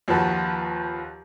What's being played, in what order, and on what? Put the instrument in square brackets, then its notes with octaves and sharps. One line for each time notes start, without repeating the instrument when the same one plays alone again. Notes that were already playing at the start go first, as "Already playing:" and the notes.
[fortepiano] D#2 F3 F#4 B4 A5